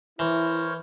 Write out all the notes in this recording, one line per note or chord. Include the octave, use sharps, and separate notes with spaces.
E3 E4 A#4 C5 C#5